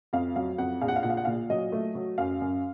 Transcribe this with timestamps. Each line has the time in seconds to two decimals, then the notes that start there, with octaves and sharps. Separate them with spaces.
0.13 F2 F5
0.36 F#3 F5
0.58 F2 F#5
0.81 A#1 F5
0.88 F#5
0.96 F5
1.03 A#2 F#5
1.10 F5
1.17 F#5
1.25 A#2 F5
1.50 F#3 D#5
1.72 A3
1.95 F#3
2.18 F#2 F5
2.41 F#2